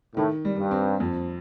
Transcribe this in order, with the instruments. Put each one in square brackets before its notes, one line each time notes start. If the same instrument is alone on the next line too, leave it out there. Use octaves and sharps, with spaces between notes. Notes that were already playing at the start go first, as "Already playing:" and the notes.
[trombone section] A2 [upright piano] D#3
[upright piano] G3
[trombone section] G2
[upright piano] C4
F2